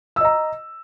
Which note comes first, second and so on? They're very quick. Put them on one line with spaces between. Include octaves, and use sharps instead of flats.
E6 D#5 A#5